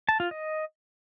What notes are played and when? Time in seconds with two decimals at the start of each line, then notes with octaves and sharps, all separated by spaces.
0.09 A5
0.20 F4
0.31 D#5